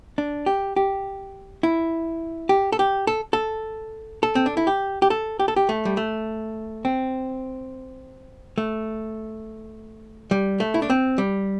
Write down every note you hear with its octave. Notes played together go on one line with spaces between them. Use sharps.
D4
G4
G4
E4
G4
A4
G4
A4
A4
A4
C4
D4
E4
G4
G4
A4
G4
A4
G4
A3
G3
A3
C4
A3
G3
A3
E4
D4
C4
G3